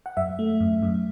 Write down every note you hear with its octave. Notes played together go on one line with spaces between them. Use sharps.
F#5
F#2 E5
A3
F#2
F#2